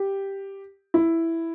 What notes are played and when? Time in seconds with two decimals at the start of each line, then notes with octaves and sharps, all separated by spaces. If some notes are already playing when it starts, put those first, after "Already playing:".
Already playing: G4
0.94 E4